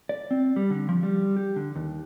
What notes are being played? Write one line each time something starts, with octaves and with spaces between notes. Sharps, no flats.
D5
C4
G3
D3
F3
G3
G4
D3
D#2